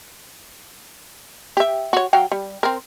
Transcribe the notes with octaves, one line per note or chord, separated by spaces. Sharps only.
G4 E5
F#4 C#5
F#3 F5 G5
G3
C4 A#4